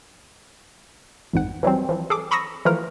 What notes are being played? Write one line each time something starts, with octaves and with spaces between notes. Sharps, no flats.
A1 F2 G#2 F#5
E3 F#3 G3 C4
E3 F3
G#4 A4 D6
A#5 B5 C#6 D#6 E6 A#6
E3 F3 A3 F4 A#4